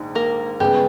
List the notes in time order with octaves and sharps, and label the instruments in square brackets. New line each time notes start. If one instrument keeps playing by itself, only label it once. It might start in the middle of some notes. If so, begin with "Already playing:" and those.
Already playing: [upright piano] A#1 G#2 D#3
[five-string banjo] A#3 A#4
[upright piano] C#2 C#3 G#3 B3 [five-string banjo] G3 G4